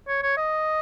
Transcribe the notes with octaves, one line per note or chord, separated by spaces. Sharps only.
C#5
C#5
D#5